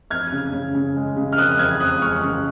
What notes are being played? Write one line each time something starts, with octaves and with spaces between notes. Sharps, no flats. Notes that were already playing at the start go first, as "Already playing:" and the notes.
F2 F6 G#6
C#3
C#3
C#3
G#3
C#3
F6
F2 D#6 F#6
F2 F6 G#6
F2 D#6 F#6
G#3 C#6 F6
C#3